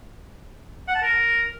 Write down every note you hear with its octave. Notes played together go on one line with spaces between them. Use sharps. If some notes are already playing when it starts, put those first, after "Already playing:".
F#5
A5
A#4